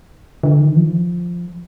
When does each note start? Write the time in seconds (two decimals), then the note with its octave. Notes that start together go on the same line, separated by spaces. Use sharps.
0.43 D3
0.60 D#3
0.76 F3